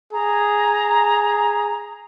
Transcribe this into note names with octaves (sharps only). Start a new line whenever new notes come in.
G#4 A#5